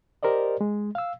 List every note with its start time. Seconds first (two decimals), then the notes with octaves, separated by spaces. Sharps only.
0.23 G4 A#4 C5 D5 D#5
0.61 G#3
0.95 F5 E6